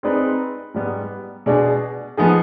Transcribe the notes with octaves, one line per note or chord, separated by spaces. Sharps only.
G#3 C4 D#4 B4 D5
G#2 G3 B3
B2 G#3 D4 G#4
F3 G#3 B3 D#4 G#4